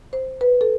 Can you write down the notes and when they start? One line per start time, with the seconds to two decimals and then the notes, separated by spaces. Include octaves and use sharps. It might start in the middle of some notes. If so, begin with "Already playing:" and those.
0.13 C5
0.41 B4
0.61 A4